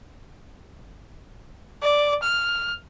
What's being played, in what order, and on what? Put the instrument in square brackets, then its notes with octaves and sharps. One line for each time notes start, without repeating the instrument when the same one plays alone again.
[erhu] D5
F6